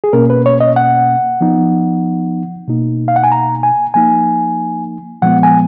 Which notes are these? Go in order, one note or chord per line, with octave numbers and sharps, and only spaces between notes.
G#4
B2 A#3 C#4 A#4
B4
C#5
D#5
F#5
F3 B3 D#4
B2 A#3 D#4
F5
F#5
G#5
A#5
G#5
F3 A#3 D#4 G#5
A#2 F3 G#3 B3 F#5
G#5